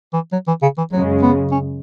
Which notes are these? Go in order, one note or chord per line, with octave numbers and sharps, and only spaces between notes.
E3
F#3
E3
C#3
E3
F#2 C#3 F#3 G#3
B3
C#4